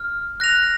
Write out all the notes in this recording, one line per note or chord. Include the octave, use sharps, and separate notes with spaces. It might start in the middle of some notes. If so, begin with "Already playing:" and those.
Already playing: F6
F#6 A#6 F7